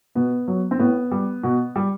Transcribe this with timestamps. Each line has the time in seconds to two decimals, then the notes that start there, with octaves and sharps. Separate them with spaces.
0.15 B2 B3
0.48 F#3
0.71 C4
0.79 A2 B3
1.11 G3
1.43 B2
1.76 G3